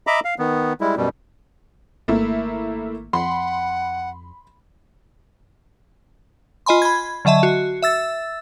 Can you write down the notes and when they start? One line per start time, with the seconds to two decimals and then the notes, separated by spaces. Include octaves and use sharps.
0.07 D#5 E5 A#5 B5 D6
0.25 F5
0.39 D#3 B3
0.81 G3 G#3 E4
0.97 F#2 B2 G3
2.08 G#1 A3 A#3 E4
3.13 F2 F#5 B5 C6
6.66 F4 D#5 G#5 B5 C6
6.82 B5 G#6
7.25 D3 F#3 D#5 E5 A5
7.43 F#4
7.82 E5 E6 A6